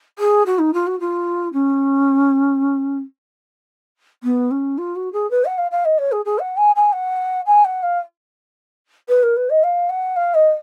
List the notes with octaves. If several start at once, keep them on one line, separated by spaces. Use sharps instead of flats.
G#4
F#4
D#4
F4
F#4
F4
C#4
B3
C#4
F4
F#4
G#4
B4
F#5
F5
F5
D#5
C#5
G#4
G#4
F#5
G#5
G#5
F#5
G#5
F#5
F5
B4
A#4
B4
D#5
F5
F#5
F5
D#5